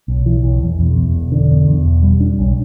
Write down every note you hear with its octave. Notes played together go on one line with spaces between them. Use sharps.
B1
E3
B1
E1
E2
E2
E1
D3
E2
E2
E1
G3
D4
B1